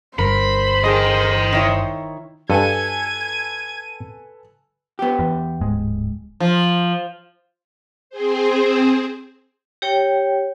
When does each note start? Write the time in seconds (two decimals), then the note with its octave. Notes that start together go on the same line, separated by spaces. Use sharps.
0.19 G1 G2 A#4 C5 B5
0.84 D3 G#4 A#4 D#5 G5
1.52 D#3 E4 C#5
2.50 G2 A4 B4 G#5 G#6 D#7
4.99 B3 G4
5.19 E2
5.61 D1 G#2 G#3
6.40 F3
8.10 C4 G#4 C5
9.82 G4 C#5 G5